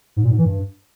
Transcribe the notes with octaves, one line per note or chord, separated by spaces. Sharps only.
G#2
A#2
G#2
E3
G2